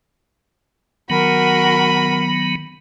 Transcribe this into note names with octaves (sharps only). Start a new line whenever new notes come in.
D#3 F#3 B3 F#4 A#4 B5